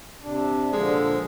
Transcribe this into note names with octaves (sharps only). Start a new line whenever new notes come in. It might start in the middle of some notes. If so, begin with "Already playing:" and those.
C3 D4
A#2 D3 F3 G#3